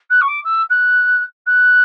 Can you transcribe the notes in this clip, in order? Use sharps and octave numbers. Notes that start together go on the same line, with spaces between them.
F#6
C#6
D6
E6
F#6
F#6